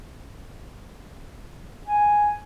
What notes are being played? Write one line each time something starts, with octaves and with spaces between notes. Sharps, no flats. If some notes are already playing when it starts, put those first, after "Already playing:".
G#5